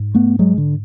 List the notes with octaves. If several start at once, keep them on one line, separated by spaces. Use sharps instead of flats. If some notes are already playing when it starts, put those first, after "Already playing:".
Already playing: G#2
A3 B3
F#3 G#3
D3